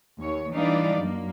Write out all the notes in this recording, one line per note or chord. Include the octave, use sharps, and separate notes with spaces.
D#2 C#5
E3 G3 D4 D#4 D5 F5
F#2 A#3